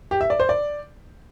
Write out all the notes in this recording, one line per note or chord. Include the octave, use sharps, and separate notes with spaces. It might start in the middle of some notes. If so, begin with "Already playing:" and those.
G4
E5
D5
C5
D5